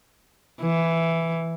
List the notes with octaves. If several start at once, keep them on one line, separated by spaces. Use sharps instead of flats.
E3